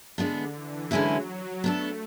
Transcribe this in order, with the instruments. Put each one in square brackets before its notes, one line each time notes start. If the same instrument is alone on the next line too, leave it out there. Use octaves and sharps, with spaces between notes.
[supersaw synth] D3 [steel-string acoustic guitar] E3 G#3 B3 D4
[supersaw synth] E3
[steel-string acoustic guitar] D3 G#3 C#4 E4 B4 [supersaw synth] F#3
[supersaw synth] F#3
[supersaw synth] A3 [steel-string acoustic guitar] B3 D4 A4